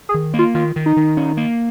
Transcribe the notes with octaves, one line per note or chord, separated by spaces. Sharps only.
G#4
D#3
A#3
F4
D#3 F4
D#3
D#4
D#3
C#4
A#3